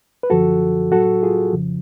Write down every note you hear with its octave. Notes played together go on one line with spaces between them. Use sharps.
B4
F#2 D3 F3 F#4 A4
A2 F#3 F#4 A4
F4 G#4
F2 C#3 F3